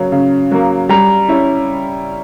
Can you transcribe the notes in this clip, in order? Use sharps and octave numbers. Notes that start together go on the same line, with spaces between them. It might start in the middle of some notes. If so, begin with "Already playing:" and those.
Already playing: C#3 F#3 A#3 C#5
C#3
F#3 A#3
G3 A#5
C#4 E4